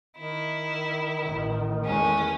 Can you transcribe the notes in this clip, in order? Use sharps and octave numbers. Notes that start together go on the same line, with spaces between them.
D#3 E4
A1 A2
E2 G#3 A3 C#4